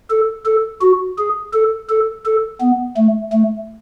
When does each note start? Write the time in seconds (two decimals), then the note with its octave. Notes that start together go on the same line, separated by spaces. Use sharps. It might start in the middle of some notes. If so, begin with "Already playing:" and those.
0.10 A4
0.45 A4
0.82 F#4
1.18 G#4
1.53 A4
1.89 A4
2.25 A4
2.61 B3
2.97 A3
3.32 A3